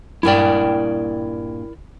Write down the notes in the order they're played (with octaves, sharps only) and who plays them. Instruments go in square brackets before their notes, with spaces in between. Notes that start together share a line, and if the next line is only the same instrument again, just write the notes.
[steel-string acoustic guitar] G2 A#2 G5 [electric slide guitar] E4 A#4 D5